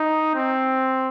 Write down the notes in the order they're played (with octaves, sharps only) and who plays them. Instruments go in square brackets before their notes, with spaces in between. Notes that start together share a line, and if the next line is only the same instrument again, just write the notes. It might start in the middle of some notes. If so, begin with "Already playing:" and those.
Already playing: [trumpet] D#4
C4